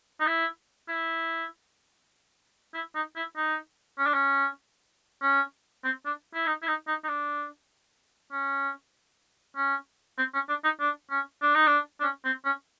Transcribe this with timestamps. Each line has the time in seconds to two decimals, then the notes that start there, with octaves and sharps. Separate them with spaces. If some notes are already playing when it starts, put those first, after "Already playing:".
0.20 D#4
0.27 E4
0.88 E4
2.74 E4
2.95 D#4
3.16 E4
3.36 D#4
3.98 C#4
4.06 D4
4.14 C#4
5.22 C#4
5.84 C4
6.05 D4
6.34 E4
6.46 D#4
6.62 E4
6.67 D#4
6.88 D#4
7.04 D#4
7.08 D4
8.32 C#4
9.56 C#4
10.18 C4
10.34 C#4
10.49 D4
10.64 D#4
10.80 D4
11.10 C#4
11.42 D4
11.55 D#4
11.67 D4
12.00 D4
12.03 C#4
12.25 C4
12.45 C#4